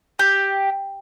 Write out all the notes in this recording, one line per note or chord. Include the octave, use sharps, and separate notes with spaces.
G4